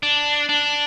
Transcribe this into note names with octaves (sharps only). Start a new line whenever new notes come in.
D4
D4